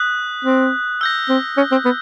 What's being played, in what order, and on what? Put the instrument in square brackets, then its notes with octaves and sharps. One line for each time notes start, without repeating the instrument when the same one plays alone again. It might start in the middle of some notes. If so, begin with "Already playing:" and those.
Already playing: [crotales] D#6 F#6 B6
[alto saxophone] C4
[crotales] E6 G6 A#6
[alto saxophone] C4
C#4
C4
B3